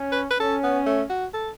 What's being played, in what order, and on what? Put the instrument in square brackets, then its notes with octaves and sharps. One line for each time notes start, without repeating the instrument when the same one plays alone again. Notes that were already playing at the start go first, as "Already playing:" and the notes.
Already playing: [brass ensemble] C#4
[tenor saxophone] B4
B4
[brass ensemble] C#4 [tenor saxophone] A4
[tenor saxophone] B3
A3
F#4
A4